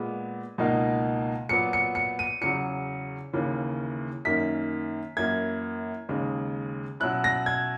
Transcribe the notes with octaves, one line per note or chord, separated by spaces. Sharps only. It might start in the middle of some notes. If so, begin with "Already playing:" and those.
Already playing: A#2 G#3 B3
C#2 B2 A#3 D#4
A#2 F#3 B3 C#7
C#7
C#7
D#7
E2 C#3 F#3 C#7
D#2 C#3 E3 A#3 C#4
F#2 D#3 A#3 C#4 B6
F#2 E3 A#3 G#6
D#2 C#3 G#3
B2 F#3 C#4 E4 F#6
A#6
G#6